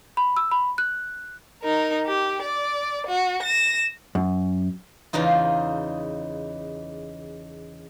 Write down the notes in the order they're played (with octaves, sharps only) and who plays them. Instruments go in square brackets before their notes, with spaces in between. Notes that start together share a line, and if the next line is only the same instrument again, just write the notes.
[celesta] B5
E6
B5
F#6
[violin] D#4 A#4
G4
D5
F#4
A#6 E7
[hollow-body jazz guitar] F#2
[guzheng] E2 C#3 D#4 F4